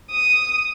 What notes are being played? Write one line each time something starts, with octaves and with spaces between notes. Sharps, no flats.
D#6